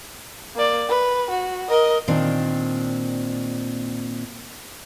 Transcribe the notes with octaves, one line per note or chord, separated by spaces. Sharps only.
A#3 D5
B4
F#4
A#4 D#5
A#2 D#3 C4 D4